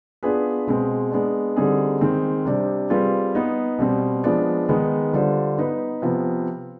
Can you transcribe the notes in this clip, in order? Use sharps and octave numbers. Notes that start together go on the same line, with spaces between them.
B3 D4 F4 G#4 B4
B2 G#3 C4
G#3 B3 D4
D3 G3 C4 D#4 G#4
D#3 G#3 C4
C3 G3 D4
G3 C4 F4 G#4 B4
B3 D#4 B4
B2 G3 C4
F3 G#3 B3 D4
D#3 G#3 B3 D#4
D3 G3 D4 F4 C5
B3 D#4 B4
C3 F3 B3